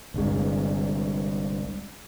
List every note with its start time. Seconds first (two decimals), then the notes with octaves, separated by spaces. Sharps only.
0.14 G1 C2 G2 G#3